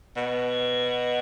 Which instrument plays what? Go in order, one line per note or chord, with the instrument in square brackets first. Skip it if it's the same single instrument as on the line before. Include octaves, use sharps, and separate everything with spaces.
[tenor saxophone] B2